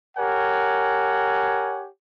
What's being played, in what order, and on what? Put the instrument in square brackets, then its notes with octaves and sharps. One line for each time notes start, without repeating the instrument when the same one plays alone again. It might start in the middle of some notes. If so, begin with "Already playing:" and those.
[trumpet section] G4 A#4 C#5 F#5 G#5